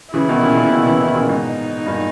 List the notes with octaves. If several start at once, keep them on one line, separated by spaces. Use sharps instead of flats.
C#3 E3 E4
B2 D#3
A#2 C#3
A#2 C#3
B2 D#3
C#3 E3
B2 D#3
A#2 C#3
G#2 B2 D#4
G2 A#2